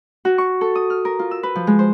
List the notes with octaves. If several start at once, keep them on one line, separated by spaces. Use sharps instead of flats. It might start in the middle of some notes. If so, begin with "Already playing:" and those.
F#4
C#6
A4
D#6
F6
A#4
F4
E6
B4
F3
G#3
C5